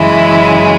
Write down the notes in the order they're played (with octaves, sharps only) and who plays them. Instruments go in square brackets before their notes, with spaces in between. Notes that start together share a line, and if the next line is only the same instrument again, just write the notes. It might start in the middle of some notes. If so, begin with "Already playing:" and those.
Already playing: [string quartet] F#2 C#3 E3 G#3 E4